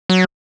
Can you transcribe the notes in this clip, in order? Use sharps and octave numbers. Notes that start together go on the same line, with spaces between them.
F#3